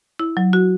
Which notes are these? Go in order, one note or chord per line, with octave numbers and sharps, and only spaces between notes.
E4
F#3
F#4